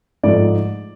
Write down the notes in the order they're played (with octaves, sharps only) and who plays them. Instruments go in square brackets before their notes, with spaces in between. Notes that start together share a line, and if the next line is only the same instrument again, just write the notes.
[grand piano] G#2 F3 A3 D5